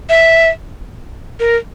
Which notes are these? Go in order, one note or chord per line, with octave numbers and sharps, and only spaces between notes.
E5
A#4